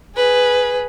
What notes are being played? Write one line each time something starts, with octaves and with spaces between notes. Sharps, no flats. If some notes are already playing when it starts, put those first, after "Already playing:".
G#4 B4